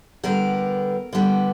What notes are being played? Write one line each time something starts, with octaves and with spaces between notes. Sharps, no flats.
D3 G3 B3 A#4
D3 G3 B3